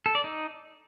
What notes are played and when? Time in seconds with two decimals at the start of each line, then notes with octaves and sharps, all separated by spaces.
0.06 A4
0.15 D5
0.24 D#4